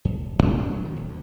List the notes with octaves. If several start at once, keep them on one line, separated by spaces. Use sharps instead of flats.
E2
D1
C#2
D4
F#3
D#3
D#1
D2